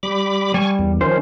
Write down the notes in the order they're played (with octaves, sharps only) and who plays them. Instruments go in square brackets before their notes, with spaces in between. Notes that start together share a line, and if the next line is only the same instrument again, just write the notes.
[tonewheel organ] G3 B5 D6
[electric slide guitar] G3 [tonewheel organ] G#5 C#6
[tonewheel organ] E2
[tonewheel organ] D#3 F3 C#4 [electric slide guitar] C5